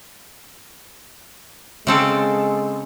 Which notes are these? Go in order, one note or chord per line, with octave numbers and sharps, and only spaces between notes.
C#3 G#3 C4 A4